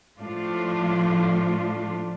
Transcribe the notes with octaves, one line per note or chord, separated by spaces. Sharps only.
A2 F3 A3 D4 F4